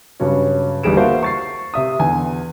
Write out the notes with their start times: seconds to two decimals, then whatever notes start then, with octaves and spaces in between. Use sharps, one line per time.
0.20 G2 C#3 F#3 C#4
0.83 G1 E2 G3 G#4 D7 E7
0.96 A#3 F#4 C5 E5 F5 A5
1.23 C#6 A6 C7
1.74 C3 E5 D#6
1.99 E2 D3 G#5